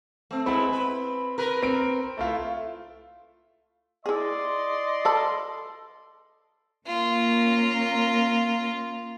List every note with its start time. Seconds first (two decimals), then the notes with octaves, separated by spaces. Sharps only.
0.31 A3 C4
0.46 G#3 B3 C4 E4 B5
0.72 B4
1.38 A#4 B4
1.62 C4 D7
2.17 A3 E4 F4
4.06 E4 G#4 D5 D#5 C6
5.05 A4 A5 B5
6.87 A#3 C#4 F4 A#4